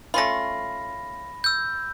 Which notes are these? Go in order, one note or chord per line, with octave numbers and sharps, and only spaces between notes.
A3 C#4 F4 B5 A#6
E6 G6